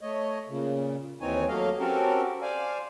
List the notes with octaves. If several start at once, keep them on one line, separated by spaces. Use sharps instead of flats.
A3 C#5 D#5
A#2 C#3
D#2 E3 C4 D#4 C#5 G#5
F#3 A3 A#3 D#5 F5
C4 C#4 F#4 G4 A4 A#4
C5 D5 F5 G#5